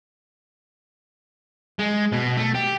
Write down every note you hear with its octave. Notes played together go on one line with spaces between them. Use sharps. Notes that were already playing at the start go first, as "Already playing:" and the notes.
G#3
B2
A3
G4